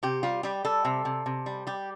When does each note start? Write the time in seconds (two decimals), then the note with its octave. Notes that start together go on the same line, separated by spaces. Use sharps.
0.03 C3 G4
0.23 G3 F4
0.43 G3 G4
0.65 G3 A4
0.85 C3
1.05 C3
1.26 C3
1.46 G3
1.67 G3 G4